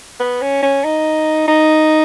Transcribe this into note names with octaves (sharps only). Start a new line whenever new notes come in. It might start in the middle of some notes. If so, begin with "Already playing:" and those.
B3
C#4
C#4
D#4
D#4